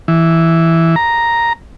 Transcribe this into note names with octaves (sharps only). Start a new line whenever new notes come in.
E3
A#5